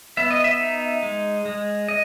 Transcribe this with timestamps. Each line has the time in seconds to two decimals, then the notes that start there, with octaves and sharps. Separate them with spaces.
0.17 B3 E5
0.31 D#5
0.44 E5
0.60 D#4
1.03 G#3
1.46 G#3
1.88 D#5